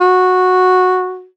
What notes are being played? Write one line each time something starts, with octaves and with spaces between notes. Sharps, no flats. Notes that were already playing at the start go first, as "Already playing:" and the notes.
F#4